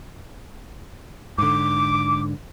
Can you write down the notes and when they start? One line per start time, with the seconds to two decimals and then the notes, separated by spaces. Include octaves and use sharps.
1.38 G#2 D3 D6